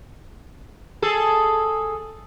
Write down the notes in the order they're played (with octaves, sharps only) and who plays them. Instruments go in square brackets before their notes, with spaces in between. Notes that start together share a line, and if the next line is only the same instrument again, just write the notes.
[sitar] G#4 A4